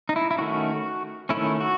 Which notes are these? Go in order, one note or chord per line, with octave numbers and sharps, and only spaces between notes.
D#4
E4
E4
D#3 A3 C#4 F#4
D#3 A3 C#4 E4
F#4